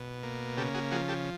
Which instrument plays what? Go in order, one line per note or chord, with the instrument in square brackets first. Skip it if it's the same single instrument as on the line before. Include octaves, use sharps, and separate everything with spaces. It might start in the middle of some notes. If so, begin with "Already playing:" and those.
Already playing: [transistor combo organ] B2
A#3
C#3 G4 A4
F#4 G#4
F3 F#4 G#4
G4 A4